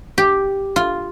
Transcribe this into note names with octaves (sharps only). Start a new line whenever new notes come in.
G4
F4